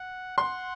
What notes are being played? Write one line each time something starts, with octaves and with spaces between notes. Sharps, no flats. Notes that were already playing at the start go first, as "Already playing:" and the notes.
Already playing: F#5
F#5 C6